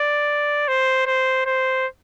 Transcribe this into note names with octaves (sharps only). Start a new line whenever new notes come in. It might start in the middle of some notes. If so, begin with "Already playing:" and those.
Already playing: D5
C5
C5
C5